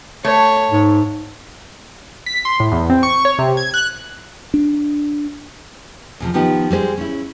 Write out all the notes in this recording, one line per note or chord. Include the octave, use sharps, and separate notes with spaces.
A3 C#5
G#2
B6
C6
A2
E2
C4
C#6
C#5
C3
G#6
F#6
D4
E2 C3 F3
D#3 F3 B3 D#4 G4
G3 G#3 B4 C5
C#4 E4